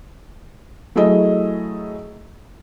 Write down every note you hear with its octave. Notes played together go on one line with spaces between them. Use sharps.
F#3 A3 E4 G#4 D#5